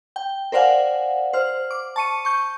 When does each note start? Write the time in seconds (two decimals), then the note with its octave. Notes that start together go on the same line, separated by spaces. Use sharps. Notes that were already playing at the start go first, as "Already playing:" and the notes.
0.16 G5
0.52 A#4 C5 D5 F5 F#5 G#5
1.33 C5 F6
1.71 D6
1.96 A5 C#6 C#7 D#7
2.25 C#6 G6